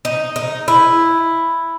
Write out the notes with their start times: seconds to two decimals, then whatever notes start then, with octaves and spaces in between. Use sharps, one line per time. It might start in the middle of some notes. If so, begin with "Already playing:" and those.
0.05 D#4
0.36 D#4
0.68 E4